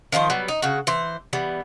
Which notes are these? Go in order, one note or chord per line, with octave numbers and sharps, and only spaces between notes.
D#3 F3 B4 C5
F#3 G3 B3
D#4
C#3 F#4
E3 C5
E3 G3 B3